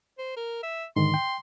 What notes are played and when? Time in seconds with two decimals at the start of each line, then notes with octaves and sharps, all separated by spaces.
0.19 C5
0.37 A#4
0.63 E5
0.96 G#2 D3 D#3 C6
1.14 G5